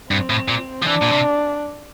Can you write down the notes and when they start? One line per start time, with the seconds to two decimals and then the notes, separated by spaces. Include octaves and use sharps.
0.10 G2 C4
0.30 A2
0.48 A#2
0.83 F3
0.87 E3 D4
1.02 A#2
1.12 C3